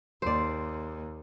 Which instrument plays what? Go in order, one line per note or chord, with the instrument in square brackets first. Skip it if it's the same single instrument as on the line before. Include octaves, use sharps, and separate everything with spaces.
[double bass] D#2 [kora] C5 D5